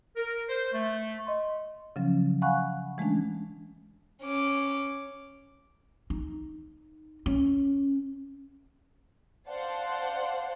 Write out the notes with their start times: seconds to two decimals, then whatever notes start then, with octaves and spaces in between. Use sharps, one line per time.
0.16 A#4
0.49 C5
0.73 A3
1.27 D#5 C6
1.96 C#3 F3 F#3 C#4
2.42 F5 F#5 G#5 B5 C#6 F#6
2.98 E3 G#3 A3 C#4 D4
4.22 C#4 D6
6.10 D#4
7.26 C#4
9.49 C5 D5 F5 F#5 A5 C6